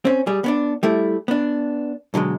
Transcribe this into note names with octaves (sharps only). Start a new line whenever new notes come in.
C4 C#4
G3 G#4
B3 C#4 D4
G3 A3 E4
B3 D4
B1 D3 F#3 G#3